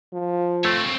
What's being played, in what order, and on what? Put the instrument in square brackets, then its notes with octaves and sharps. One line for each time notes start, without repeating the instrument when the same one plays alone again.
[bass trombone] F3
[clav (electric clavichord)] A3 [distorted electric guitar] C4 C#5